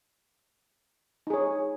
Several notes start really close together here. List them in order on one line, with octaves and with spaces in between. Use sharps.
D#4 G#4 C#5